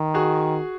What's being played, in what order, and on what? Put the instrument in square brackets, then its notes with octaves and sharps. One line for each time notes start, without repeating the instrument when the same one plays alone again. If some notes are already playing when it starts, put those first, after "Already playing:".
Already playing: [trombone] D#3
[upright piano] F#4 G#4